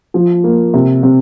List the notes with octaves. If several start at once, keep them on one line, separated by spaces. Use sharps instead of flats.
F3
A#3
C3
C3